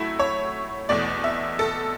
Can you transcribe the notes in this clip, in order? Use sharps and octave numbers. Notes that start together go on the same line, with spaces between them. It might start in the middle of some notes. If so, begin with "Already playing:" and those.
Already playing: A2 F#3 A3 E4
C#5
E2 B2 A3 D5
E5
A4